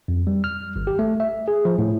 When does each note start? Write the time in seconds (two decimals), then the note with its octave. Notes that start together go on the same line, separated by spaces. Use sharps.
0.08 F2
0.27 G3
0.44 F6
0.76 G#1
0.87 G4
0.99 A3
1.20 E5
1.48 G#4
1.65 F3
1.78 A2